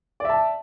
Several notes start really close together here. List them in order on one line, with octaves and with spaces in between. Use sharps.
D5 E5 A5